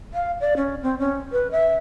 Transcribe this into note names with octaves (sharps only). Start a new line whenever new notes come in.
F5
D5
C#4
C4
C#4
B4
E5